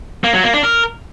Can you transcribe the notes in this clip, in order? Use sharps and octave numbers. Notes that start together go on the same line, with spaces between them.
A#3
F#3
A#3
D4
A#4